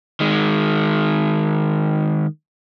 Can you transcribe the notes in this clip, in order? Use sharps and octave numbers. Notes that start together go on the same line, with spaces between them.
D#3 G#3